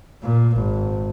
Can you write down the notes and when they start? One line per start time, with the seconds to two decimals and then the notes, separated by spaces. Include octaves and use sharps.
0.23 A#2
0.57 G#1